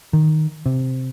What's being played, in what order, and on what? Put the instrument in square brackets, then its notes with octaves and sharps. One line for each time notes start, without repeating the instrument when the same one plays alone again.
[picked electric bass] D#3
C3